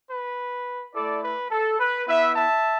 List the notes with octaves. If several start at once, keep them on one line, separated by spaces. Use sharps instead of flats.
B4
A3 E4 A4 D5
B4
A4
B4
B3 E4 B4 E5
E5 A5